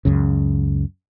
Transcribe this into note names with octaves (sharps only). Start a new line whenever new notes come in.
C#2 F#2 C#3